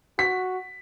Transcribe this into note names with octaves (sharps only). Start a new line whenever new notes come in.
F#4 B6